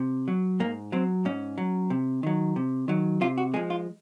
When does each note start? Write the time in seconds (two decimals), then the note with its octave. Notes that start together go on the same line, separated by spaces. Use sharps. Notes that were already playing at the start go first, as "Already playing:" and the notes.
Already playing: C3
0.28 F#3
0.60 G#2 A#3
0.92 F#3 C4
1.25 G#2 C#4
1.58 F#3
1.90 C3
2.23 D#3 F#3
2.56 C3
2.88 D#3 F#3
3.21 C3 F4
3.38 F#4
3.54 F3 G#3 G#4
3.70 F4